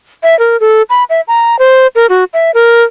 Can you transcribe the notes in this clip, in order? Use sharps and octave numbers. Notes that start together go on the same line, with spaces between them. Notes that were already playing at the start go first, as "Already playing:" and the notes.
E5
A#4
A4
B5
E5
A#5
C5
A#4
F#4
E5
A#4